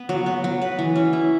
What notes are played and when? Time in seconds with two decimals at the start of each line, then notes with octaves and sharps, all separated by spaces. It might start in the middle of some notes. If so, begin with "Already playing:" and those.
Already playing: B3
0.09 F#3
0.26 B3
0.44 F#3
0.62 B4
0.79 E3
0.96 C#4
1.13 E4